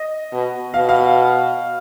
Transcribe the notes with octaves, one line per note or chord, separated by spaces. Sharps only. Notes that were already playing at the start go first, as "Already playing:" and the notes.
Already playing: D#5
B2
B2 F5
F5